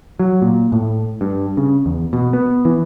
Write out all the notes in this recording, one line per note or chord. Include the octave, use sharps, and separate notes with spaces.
F#3
A#2
A2
G2
C#3
E2
B2
B3
E3